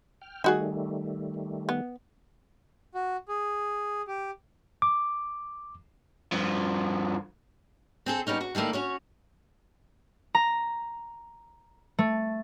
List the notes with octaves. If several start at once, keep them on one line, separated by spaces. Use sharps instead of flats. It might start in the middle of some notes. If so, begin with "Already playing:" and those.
G5 F6
D#3 G3 A3 D#4 F#4 G#4
B3
F#4
G#4
G4
D6
G2 F3
C4 G#4 A4
G3 B3 C#4 D#4
F#4
D#3 G3 A3 A#3 E4
C#4 F#4 C#5
A#5
A3